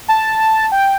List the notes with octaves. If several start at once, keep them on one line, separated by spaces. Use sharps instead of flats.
A5
G5